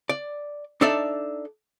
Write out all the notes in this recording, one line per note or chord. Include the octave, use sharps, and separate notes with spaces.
D5
D4 D#4 A4 D5 E5